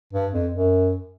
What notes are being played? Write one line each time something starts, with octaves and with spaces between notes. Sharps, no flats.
G2
F2
F#2